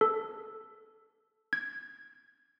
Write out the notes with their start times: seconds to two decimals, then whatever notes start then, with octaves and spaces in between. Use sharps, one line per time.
0.01 A4
1.53 G#6